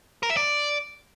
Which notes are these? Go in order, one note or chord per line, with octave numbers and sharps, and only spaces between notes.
A#4
E5
D5